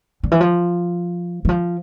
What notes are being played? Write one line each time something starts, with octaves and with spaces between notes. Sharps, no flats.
D3
E3
F3
E3
F3